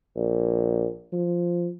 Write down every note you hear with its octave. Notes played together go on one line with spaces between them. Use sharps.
A#1
F3